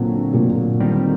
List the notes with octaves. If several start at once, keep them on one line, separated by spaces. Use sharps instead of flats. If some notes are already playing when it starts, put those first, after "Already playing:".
Already playing: A#2 D3 F#3 C4
A#2
D#3 G3 C4